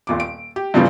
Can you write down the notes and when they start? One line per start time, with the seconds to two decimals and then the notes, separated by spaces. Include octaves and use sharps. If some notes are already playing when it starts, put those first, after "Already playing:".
0.07 D#1 A#2 D6
0.20 D7
0.56 G4
0.74 G2 A#2 C#3 E3 F3 G3